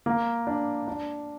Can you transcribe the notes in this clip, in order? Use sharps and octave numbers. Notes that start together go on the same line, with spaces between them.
A#3
D4
D4